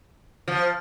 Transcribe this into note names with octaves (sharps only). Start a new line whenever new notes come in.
F3